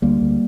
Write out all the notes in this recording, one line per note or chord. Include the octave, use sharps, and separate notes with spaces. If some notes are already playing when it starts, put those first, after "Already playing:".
D2 G3 A#3
D2